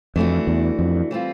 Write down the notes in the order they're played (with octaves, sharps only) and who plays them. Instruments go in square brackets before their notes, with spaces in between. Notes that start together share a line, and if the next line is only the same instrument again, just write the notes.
[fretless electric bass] F2 [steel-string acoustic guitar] E3 A3 D4 F#4
[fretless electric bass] E2
F2
[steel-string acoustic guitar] E3 G3 C4 F4